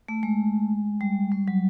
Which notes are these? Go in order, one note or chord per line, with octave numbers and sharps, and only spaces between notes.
A3
G#3
G3
G3
F#3